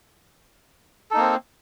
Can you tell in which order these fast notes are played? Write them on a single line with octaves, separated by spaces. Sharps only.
A4 D#4 A#3 C4